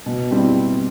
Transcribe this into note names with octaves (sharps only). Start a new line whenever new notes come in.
B2
G3 C4 E4